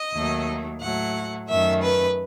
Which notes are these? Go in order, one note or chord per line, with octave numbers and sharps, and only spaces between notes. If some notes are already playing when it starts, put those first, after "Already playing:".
Already playing: D#5
D#2 D#3 F#3 A3
A2 F#3 A3 F#5
F#2 D#3 A3 E5
B4